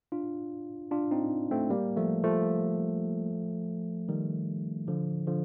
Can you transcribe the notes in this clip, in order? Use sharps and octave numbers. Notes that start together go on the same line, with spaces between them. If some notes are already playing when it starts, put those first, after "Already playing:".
D4 F4
D4 F4
C4 D#4
A3 C4
G3 A#3
F3 A3
F3 A3
D#3 G3
D3 F3
D3 F3